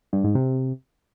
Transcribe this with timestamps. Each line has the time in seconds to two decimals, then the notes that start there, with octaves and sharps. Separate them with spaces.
0.13 G2
0.24 G#2
0.35 C3